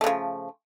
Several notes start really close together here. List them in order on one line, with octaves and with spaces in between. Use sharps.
A3 C#3 F3